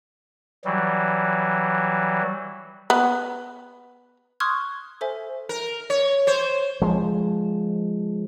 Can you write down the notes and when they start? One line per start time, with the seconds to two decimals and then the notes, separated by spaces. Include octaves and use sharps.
0.65 E3 F#3 G3
2.90 B3
4.40 C6 C#6 D#6 F6 F#6 G#6
5.01 A4 C5 E5 G#5
5.49 A#4
5.90 C#5
6.27 C5 C#5
6.82 F3 G#3